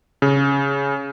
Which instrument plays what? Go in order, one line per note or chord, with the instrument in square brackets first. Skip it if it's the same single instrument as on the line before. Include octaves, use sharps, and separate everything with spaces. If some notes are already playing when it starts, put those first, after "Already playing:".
[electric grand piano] C#3